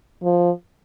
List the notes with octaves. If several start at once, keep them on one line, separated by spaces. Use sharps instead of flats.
F3